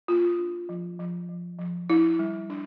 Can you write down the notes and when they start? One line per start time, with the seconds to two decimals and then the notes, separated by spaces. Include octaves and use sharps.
0.08 A#3 F4
0.39 D4
0.69 F3
0.99 F3
1.29 F3
1.59 F3
1.89 D4 E4
2.19 G3
2.50 D4